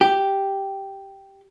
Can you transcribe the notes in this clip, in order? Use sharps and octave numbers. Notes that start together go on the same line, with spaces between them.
G4